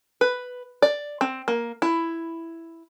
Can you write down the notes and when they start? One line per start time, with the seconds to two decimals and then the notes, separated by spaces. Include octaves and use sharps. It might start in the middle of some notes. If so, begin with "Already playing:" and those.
0.21 B4
0.82 D5
1.21 C4
1.48 A#3
1.82 E4